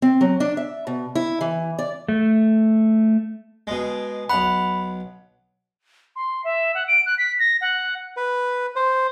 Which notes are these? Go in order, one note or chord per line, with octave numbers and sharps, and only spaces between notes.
C4
F#3
D4
E5
B2
E4
E3
D5
A3
B2 G#3
B1 F#5 B5
C6
E5
F#5
D7
F#6
B6
A#6
F#5
B4
C5